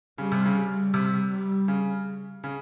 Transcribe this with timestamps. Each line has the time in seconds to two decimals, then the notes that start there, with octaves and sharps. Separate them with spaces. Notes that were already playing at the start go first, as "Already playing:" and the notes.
0.18 C#3 G3
0.32 C3
0.46 C#3
0.56 G3
0.94 C3
1.31 G3
1.68 C#3
2.44 C#3